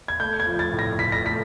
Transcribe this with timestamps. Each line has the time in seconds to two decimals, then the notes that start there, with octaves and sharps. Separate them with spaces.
0.08 G#6
0.19 A3 G6
0.40 G#6
0.46 F3
0.59 A6
0.73 A2
0.79 A#6
0.98 A2 B6
1.12 A#6
1.26 A3 B6